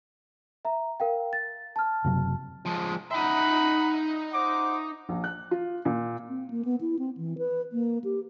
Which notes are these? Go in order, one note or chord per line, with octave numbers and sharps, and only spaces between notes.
E5 A#5
A#4 F5 G5
A6
A5 F6
F#1 C3 F#3
F3 G#3
D#4 E5 F#5 A#5 B5
C5 F#5 D6
A#1
F#6
F4
A#2
C4
A#3
B3
E4
C4
E3
B4
A#3
G4